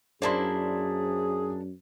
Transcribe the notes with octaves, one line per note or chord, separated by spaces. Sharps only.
F#2 A#3 D4 E4 G#4 C5 D5 C6